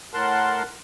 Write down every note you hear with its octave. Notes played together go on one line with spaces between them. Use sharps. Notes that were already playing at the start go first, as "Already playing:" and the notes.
A2 A#4 F#5 A5 C6